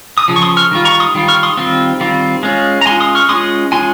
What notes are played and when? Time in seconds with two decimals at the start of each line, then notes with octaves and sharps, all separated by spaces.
0.18 D#6
0.28 C#3 F3
0.36 C#6
0.42 C6 D#6
0.57 C#6 F6
0.71 D#3 G3 F4
0.85 A#5 C#6
1.00 C6 D#6
1.15 D#3 G3 F4
1.28 C#6 F6
1.43 C6 D#6
1.57 D#3 G3 C4 F4
2.00 D#3 G3 C4 F4
2.43 G#3 C#4 F4
2.81 A#5
2.86 G#3 C#4 F4 G#5 C6
3.00 C6 D#6
3.15 C#6 F6
3.29 G#3 C#4 F4 C6 D#6
3.72 G#3 C#4 F4 G#5 C6